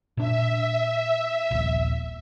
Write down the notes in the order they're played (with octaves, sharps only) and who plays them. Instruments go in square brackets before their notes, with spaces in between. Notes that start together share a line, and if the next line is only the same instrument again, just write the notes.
[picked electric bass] A#2 D4 [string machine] E5
[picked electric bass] D#1 A#1